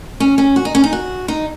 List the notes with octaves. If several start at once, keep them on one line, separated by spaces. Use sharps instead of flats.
C#4
C#4
F#4
D#4
C#4
D#4
F#4
D#4